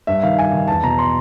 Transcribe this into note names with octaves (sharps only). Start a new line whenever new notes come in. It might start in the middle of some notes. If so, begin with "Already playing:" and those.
G2 E5
D#3 F5
G2 G#5
D#3
E2 A5
B2 A#5
C6